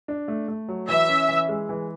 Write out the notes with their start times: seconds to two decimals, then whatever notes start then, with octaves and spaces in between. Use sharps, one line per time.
0.08 D4
0.28 A3
0.48 A3
0.68 F#3
0.88 E3 E5
1.09 C#4
1.29 E3
1.49 G#3
1.69 E3